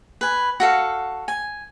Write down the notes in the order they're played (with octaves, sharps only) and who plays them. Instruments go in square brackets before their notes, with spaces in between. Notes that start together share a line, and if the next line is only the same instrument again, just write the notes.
[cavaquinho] B4 G#5
F#4 A4 F5
G#5